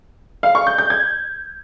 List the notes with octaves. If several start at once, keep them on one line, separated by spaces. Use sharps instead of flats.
F5
C#6
G6
G6
G#6